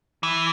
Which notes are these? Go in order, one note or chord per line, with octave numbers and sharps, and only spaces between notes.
E3